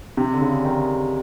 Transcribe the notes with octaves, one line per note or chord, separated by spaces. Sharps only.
C3
D3
C#3
D#3